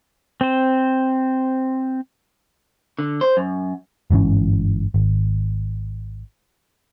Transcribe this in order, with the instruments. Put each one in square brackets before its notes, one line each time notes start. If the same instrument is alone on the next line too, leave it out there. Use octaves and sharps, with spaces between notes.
[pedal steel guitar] C4 C5
[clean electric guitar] D3
C5
F#2
[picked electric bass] G1 G#2 E3 C#4
G#1